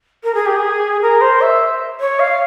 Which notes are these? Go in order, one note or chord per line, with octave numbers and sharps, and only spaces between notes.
A#4
G#4
G4
G#4
A#4
C5
E5
C#5
F5